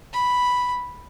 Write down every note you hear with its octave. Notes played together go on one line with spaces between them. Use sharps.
B5